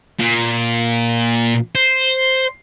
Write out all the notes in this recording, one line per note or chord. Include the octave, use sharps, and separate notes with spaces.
A#2
C5